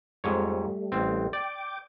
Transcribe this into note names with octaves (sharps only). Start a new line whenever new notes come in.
F2 G#2 G3 A3 C#5
A1 C4
D5 G5 D6